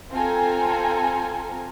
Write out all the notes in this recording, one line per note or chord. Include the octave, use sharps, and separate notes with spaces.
C4 F4 A4 G#5 A#5